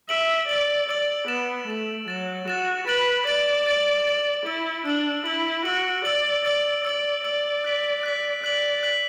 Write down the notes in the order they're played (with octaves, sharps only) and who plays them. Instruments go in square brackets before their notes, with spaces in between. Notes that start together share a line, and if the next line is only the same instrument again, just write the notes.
[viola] E5 [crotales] E6 D7 F#7
[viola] D5 [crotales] E6 D7 F#7
[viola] D5 [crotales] E6 D7 F#7
[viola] B3 [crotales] A6 E7
[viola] A3 [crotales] A6 E7
[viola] F#3 [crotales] A6 E7
[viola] F#4 [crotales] A6 E7
[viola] B4 [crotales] A6 D7 F#7
[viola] D5 [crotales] A6 D7 F#7
[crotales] A6 D7 F#7
A6 D7 F#7
[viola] E4 [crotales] E6 D7 F#7
[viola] D4 [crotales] E6 D7 F#7
[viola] E4 [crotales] E6 D7 F#7
[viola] F#4 [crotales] E6 D7 F#7
[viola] D5 [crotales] E6 D7 F#7
[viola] D5 [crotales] E6 D7 F#7
[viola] D5 [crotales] E6 D7 F#7
[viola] D5 [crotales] E6 D7 F#7
[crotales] F#6 B6 F#7
F#6 B6 F#7
[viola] D5 [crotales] F#6 B6 F#7
[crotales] F#6 B6 F#7